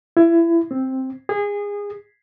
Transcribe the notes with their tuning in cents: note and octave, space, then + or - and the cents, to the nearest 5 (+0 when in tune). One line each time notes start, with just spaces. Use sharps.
E4 +25
C4 +5
G#4 -25